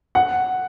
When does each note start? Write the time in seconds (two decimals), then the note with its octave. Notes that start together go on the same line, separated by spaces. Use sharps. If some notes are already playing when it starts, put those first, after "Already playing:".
0.15 F#5